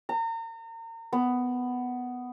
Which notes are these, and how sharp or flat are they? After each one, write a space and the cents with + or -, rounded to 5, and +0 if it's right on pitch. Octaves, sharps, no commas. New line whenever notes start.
A#5 -35
B3 +10